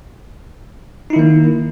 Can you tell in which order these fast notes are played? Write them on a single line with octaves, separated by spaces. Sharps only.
D#4 E4 D#3 A#3